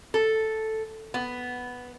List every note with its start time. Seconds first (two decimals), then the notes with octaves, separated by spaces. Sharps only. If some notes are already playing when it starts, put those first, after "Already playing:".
0.14 A4
1.14 B3